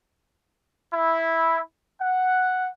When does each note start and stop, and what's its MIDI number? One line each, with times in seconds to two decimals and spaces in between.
0.93 1.60 64
1.99 2.68 78